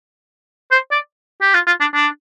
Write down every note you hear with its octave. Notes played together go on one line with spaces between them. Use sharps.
C5
D5
G4
F4
F4
D4
D4